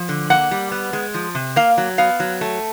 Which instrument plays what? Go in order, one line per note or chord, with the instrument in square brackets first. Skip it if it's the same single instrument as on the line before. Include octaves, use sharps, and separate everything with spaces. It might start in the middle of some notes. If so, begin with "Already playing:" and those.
Already playing: [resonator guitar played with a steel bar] F3
D3
A#3 F#5
G3
B3
G#3
F3
C3
A#3 F5
F#3
B3 F5
F#3
A3